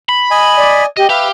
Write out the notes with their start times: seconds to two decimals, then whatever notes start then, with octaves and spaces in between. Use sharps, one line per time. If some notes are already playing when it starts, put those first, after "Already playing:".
0.09 B5
0.31 D#5 G#5
0.57 D5
0.97 G4 D#5
1.10 G4 B4 E5 F5